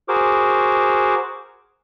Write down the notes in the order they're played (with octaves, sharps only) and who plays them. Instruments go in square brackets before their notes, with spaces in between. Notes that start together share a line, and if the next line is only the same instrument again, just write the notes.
[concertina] F#4 G#4 A#4 C5 D6